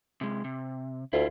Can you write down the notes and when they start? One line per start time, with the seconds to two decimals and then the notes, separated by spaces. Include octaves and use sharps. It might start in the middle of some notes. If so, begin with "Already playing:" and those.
0.21 C3 G#3
0.44 C3
1.13 D2 E4 F4